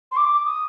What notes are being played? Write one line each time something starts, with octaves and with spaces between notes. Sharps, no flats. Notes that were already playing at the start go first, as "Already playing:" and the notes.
C6
D6
D#6